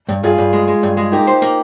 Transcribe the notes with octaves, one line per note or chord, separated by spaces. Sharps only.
G2
G2 F4 G#4
G2
G#3
G#3
G2
G#3
A#3 D#4 G4
C5
A#3